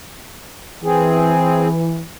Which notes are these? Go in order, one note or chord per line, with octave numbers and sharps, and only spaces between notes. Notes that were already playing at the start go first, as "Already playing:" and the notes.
E3 C4 G#4